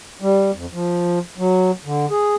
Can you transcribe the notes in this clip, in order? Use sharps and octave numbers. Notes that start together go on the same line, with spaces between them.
G3
F2
F3
F#3
D3
G#4